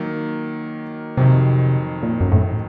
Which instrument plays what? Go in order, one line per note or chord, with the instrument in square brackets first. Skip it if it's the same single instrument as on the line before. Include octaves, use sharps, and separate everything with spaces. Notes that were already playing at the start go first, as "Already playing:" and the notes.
Already playing: [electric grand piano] D#3 F#3 A#3
[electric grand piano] F2 D#3 F#3 [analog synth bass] C3
[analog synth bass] A#2
F#2
A2